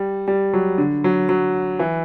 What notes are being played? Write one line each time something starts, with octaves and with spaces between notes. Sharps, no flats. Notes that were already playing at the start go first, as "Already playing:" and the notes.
Already playing: G3
G3
F#3
D3
F#3
F#3
E3